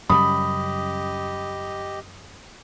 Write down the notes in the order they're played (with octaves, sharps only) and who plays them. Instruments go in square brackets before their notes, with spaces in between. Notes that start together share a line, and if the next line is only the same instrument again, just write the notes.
[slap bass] F#2 C#3 G3 [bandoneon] G4 D#5 [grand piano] B5 [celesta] D#6